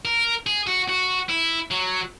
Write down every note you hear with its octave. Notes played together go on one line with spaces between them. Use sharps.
A#4
G#4
F#4
F#4
E4
F#3